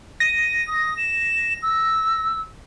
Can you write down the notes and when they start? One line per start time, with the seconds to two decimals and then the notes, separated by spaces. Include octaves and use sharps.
0.20 A#6 D#7
0.67 D#6
0.97 E7
1.62 E6